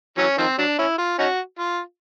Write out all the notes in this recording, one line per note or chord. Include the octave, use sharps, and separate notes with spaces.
E3 F#3 C#4
D#3 F3 C4
F#3 D4
C#4 E4
F4
C#4 D#4 F#4
F4